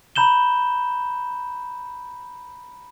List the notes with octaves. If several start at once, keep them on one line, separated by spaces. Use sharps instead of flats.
A#5 B5 G6 E7 G7